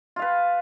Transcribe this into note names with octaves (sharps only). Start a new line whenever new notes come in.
F4 B4 F5